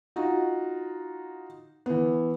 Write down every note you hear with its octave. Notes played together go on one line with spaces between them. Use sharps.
D#4 F4 F#4
E3 B3